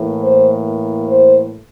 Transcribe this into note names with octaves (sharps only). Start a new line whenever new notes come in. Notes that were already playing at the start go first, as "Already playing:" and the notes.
Already playing: A2 E3 A#3
C5
C5